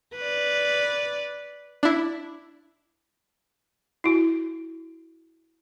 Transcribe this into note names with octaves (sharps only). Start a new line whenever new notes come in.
B4 D5
D4 E4
E4 F#4